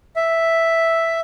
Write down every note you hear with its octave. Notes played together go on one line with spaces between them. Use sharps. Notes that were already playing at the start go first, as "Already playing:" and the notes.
E5